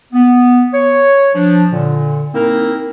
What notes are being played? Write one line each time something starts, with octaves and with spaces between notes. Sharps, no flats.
B3
C#5
F3 D4
A#2 D3
A#3 C4 D#4 E4 A#4